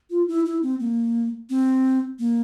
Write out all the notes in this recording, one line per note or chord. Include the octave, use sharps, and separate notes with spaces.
F4
E4
E4
C4
A#3
C4
A#3